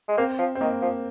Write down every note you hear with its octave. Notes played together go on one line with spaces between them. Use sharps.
G#3
A#3 C4
F3
C4
D#3 A#3
F3